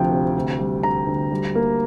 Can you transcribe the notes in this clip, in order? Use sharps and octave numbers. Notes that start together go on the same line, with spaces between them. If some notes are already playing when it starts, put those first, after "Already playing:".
Already playing: D2 C3 F3 G5
C3
D2
G3
D3 A#5
D2
G3
A#3